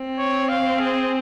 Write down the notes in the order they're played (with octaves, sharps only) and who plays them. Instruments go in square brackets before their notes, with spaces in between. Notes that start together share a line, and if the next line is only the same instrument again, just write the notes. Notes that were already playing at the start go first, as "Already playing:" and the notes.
Already playing: [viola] C4
[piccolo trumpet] C#5
F5
G#4